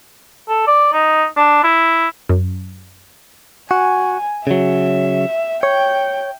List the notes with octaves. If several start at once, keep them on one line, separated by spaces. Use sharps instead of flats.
A4
D5
D#4
D4
E4
F#2
F#4 G#5
C#3 F#3 E5
C#5 G5